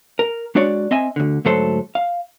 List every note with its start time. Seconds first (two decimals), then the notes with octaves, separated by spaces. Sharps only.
0.19 A#4
0.55 G#3 D4 F#4 C#5 D5
0.91 C4 D#5 E5 G#5
1.16 D2 D3
1.45 D2 G#2 F#3 A3 A4 C5
1.95 F5